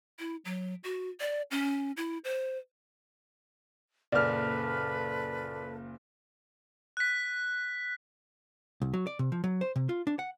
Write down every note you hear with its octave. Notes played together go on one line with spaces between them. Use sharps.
E4
F#3
F#4
D5
C#4
E4
C5
F#1 A#2 A4 B4 D5 F6
F#6 B6
C2
F#3
D5
C3
F3
F#3
C5
C3
F4
D4
F#5